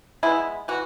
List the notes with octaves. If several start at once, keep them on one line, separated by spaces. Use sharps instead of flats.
G#3 B3 E4
E3 F#4